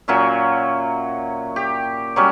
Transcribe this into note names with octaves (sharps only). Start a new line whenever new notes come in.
A#2 F#3 C#4 E5
G4
F#3 G3 C#4